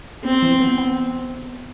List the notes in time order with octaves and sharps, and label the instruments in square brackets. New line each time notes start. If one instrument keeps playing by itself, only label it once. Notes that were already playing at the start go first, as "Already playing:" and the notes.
[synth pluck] B3 [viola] C4
[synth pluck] E3
B3
B3